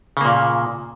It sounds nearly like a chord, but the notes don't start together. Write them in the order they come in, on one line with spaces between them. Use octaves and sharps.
C#3 A#3 A#2